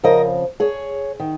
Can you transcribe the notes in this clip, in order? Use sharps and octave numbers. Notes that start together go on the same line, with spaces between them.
F2 C#3 F3 A#4 D#5
G#4 C#5
D#3